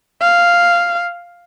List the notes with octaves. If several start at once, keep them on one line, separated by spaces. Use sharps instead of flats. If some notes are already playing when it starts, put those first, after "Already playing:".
F5